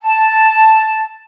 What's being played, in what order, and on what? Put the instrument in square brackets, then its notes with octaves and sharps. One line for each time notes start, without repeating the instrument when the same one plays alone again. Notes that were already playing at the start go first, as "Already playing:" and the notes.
[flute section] A5